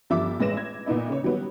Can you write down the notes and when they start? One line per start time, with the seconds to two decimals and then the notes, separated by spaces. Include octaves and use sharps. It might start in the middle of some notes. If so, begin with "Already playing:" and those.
0.10 G1 G2 F3 E5 D6 E6
0.40 A1 G#3 B4 A#6 E7
0.57 G#6
0.86 A#2 B3 D#4 E4
1.09 C#3 C#5
1.23 D#3 F#3 G3 B3